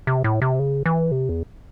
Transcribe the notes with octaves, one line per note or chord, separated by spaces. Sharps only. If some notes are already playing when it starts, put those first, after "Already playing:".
C3
A2
C3
C#3
E3
C3
E2